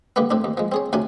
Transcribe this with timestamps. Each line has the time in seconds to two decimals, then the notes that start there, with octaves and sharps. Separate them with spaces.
0.16 D3 G3 A#3 B3
0.31 A2 C4 D4
0.44 D#2
0.57 F3 G#3
0.72 C4 G#4 C#5
0.93 D2 C3 C#4 D4 D5 G#5